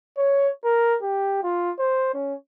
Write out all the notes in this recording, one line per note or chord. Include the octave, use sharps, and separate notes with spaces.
C#5
A#4
G4
F4
C5
C#4